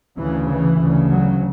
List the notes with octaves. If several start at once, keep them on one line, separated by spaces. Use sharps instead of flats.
D2 C#3 E3
E3
D2 C#3
F#3